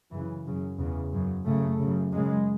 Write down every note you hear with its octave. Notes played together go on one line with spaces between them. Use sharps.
F#2 C#3 E3
F#2 C#3
E2 C#3
F#2 C#3
F#2 C#3 A3
F#2 C#3
F#2 C#3 G#3